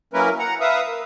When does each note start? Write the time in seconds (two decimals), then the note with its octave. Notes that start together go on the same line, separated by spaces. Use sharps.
0.14 F#3 A#3 C#4 E4 A#4 B4
0.39 F#5 A#5
0.61 B4 E5 F5 D#6
0.86 A#3